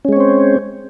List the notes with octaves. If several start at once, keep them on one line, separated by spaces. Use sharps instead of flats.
G#3 C4 C#4 C5 C#5